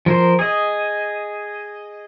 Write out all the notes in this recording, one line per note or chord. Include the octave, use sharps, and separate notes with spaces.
F3 A#4 C5
G#4 D#5